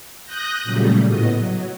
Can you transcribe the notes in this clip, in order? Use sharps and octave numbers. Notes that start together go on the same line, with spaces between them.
D#6 F#6 G6 A#6
A#2 C#3 F#3 G3 A3
A2 B3 D#5
F#3